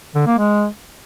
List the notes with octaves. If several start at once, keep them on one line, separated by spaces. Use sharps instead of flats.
D3
A#3
G#3